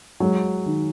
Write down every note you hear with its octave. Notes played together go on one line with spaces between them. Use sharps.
F#3 G#3
D#3